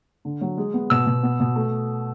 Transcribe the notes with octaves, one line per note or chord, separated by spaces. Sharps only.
D3
F#3
G#3
B3
B2 E6
B2
B3
B2
A3